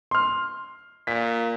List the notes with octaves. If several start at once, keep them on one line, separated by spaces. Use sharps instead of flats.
C6 F6
A#2 B6